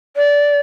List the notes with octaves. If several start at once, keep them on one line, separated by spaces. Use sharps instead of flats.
D5